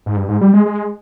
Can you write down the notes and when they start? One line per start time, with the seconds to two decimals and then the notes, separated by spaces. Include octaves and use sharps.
0.06 G#2
0.16 G2
0.28 G#2
0.41 G3
0.53 G#3
0.66 G#3